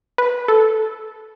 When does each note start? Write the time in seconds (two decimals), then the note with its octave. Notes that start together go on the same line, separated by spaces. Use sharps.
0.18 B4
0.48 A4